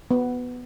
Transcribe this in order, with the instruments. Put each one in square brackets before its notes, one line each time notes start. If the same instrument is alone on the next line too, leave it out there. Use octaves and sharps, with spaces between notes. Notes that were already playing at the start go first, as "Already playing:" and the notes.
[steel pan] B3